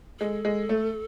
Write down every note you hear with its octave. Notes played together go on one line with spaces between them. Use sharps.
G#3 A4
G#3
A3